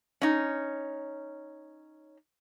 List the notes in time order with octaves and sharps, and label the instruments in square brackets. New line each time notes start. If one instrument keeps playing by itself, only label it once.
[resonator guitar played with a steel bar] C#4 D#4